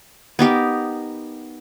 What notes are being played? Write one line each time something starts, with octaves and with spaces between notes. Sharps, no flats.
B3 D#4 G4 A#4